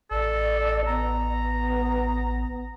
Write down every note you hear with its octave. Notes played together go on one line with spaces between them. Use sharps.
A1 A4 D5
B3 A#5